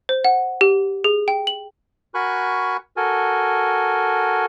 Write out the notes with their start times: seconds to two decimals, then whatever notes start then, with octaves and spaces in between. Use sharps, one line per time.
0.09 C5
0.25 F#5
0.61 G4
1.04 G#4
1.28 G5
1.47 F#7
2.14 F#4 A#4 G#5 B5 C#6 F#6
2.97 F#4 A4 A#4 G#5